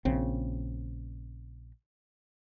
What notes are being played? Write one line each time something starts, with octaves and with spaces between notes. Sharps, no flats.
A#1 C#3 C4